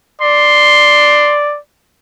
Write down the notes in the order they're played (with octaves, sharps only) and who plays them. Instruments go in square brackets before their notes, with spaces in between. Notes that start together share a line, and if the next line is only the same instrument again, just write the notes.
[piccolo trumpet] D5 [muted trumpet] C6